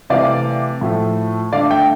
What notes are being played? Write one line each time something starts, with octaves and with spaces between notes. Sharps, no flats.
C3 E3 A3 D5 F5
A2 F3 A3
D3 A3 D5 F5
E5 G5